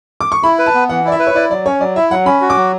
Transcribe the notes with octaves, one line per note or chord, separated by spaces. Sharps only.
D6
C#6
E4 B5
B4
A5
B3
E3 F#5
E4 D5
E5
B4
C#5
E4 D5
F#3 D5
C#4 C#5
F#3 D5
E4 E5
F#3 F#5
C#4 B5
F#4
D6
F#3